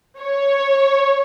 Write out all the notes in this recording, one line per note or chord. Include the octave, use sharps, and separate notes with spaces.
C#5